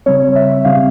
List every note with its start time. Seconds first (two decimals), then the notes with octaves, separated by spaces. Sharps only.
0.06 C#3 G3 C4 C#5
0.36 E5
0.65 C#3 G3 C4 F5